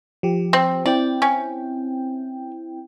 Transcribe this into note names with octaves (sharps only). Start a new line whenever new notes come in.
F3 G4
C4
C4 E4 D5 G5
C#4